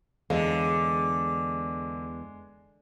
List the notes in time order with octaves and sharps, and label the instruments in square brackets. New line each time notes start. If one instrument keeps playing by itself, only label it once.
[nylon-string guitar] E2 C#5 F5 [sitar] D3 [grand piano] G#3